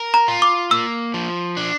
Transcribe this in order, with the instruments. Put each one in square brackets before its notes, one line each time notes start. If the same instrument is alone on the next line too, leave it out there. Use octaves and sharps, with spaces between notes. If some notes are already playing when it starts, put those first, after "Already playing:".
Already playing: [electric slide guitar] A#4
[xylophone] A#5
[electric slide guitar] F4
[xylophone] D6
[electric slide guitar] A#3 [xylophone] E6
[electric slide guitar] F3
D4